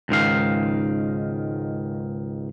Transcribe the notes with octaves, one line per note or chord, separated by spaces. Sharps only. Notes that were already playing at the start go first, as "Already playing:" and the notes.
C#2 G#2 D#3 F5